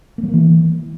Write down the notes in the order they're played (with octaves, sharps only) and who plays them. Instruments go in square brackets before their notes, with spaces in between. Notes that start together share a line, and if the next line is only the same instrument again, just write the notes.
[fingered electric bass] A#3
F#3
A#3
E3